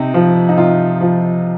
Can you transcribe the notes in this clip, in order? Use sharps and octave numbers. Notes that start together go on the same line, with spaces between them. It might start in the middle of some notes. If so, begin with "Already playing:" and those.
Already playing: C3 D#4
F3
D#4
C3 F4
F3